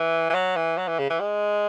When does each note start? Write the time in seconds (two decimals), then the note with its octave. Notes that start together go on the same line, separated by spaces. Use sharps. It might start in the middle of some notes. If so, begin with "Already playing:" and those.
Already playing: E3
0.30 E3
0.34 F#3
0.56 E3
0.78 F#3
0.88 E3
0.99 C#3
1.10 E3
1.20 G#3